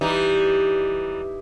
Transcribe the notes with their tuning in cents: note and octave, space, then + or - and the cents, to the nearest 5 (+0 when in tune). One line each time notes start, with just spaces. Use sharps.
E3 +0 G3 +0 D#4 +0